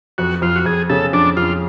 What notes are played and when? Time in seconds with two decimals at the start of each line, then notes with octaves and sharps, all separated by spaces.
0.18 F2 F#4
0.42 F2 F4
0.56 F#4
0.65 F2 G#4
0.90 C#3 A4
1.13 F2 D4
1.37 F2 F4